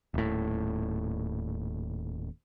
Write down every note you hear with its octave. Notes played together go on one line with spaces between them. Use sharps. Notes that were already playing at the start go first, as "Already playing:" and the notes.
D#1 A2